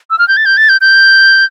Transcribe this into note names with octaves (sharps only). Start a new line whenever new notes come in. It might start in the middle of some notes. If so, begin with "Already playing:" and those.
E6
F6
G6
A6
G6
A6
G6
G6